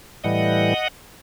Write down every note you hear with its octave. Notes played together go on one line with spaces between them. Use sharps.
A2 E3 G3 D#5 F#5